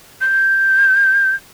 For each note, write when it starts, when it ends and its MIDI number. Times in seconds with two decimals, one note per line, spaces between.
0.21 1.35 91